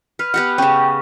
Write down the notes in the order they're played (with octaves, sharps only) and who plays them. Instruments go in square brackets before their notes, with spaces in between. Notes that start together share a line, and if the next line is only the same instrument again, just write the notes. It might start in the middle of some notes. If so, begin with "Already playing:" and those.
[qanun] B4 [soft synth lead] F6
[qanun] B3 G4 F#5
[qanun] C#3 C#4 [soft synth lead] G5